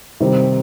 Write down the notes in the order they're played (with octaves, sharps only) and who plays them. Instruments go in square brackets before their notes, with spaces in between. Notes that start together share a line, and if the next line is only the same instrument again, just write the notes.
[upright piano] C3 D#3 G3 C4 D#4